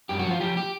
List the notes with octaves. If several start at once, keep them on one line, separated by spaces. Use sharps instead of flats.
F#2 G4
F#4
F3
F4
F3 G4
G4